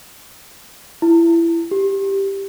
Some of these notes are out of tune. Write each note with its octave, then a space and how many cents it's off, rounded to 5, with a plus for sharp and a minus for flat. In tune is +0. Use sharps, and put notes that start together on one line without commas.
E4 +20
G4 +0